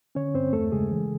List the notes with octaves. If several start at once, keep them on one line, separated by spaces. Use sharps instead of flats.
D3 C#4 C#5
G2 C4 C5
E2 A3 A4
C#3 G#3 G#4
E3